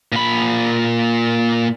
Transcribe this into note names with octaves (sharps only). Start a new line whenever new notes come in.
A#2 B5